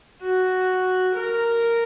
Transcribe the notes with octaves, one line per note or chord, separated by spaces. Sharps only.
F#4
A#4